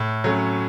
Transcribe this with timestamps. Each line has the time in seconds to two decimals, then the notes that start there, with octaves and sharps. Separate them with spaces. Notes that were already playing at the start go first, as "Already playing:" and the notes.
Already playing: A2
0.24 F#3 A3 C#4